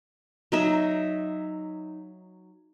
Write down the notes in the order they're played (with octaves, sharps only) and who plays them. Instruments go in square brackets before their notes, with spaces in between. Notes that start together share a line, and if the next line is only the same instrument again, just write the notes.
[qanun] F#3 D#4 E5